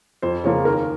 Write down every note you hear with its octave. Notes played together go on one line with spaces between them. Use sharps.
F2 C5
C#3 F3 A#3 C#5
D#2 A#4